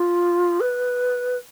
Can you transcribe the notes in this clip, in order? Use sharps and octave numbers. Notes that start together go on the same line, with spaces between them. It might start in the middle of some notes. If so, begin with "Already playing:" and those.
Already playing: F4
B4